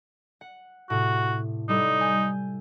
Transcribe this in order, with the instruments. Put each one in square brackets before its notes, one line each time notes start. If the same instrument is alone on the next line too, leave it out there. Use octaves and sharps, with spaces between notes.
[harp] F#5
[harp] A2 C3 [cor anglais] F#4
[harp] G3 E4 A4 [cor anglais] D#4
[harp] G#5 G6